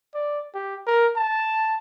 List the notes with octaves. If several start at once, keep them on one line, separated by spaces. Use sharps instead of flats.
D5
G4
A#4
A5